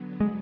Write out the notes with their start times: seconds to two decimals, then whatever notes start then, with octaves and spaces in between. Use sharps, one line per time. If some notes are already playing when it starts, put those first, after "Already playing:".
Already playing: D3 F#3 B3
0.20 G#3